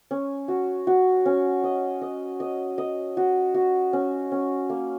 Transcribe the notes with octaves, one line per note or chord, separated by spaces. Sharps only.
C#4
F#4
F#4
C#4
D#5
D#5
D#5
D#5
F#4
F#4
C#4
C#4
A#3